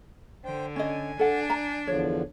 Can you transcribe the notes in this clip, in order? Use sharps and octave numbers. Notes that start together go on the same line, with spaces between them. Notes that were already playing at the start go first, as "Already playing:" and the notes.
D3 C5 G5
C#4 D#5 G#5
D4 A4 F#5
A#5
E2 D3 F3 C#5